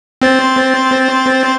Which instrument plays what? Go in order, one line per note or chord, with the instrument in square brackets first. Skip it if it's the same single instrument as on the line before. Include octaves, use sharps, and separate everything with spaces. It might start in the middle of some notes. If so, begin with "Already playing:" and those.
[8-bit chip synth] C4 C5 A6